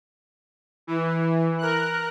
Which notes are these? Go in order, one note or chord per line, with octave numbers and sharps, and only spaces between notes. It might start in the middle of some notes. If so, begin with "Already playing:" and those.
E3
A#4 F#6